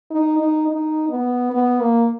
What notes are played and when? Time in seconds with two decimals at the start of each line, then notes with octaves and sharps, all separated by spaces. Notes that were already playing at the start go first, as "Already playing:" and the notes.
0.11 D#4
0.39 D#4
0.67 D#4
1.09 B3
1.52 B3
1.80 A#3